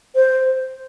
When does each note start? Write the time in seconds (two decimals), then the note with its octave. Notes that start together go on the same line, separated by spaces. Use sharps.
0.15 C5